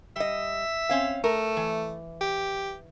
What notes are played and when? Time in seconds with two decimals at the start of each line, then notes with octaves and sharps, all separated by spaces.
0.16 G3 D#5 E5
0.89 C4 C#4 F5
1.24 A3 A#4
1.57 E3
2.21 G4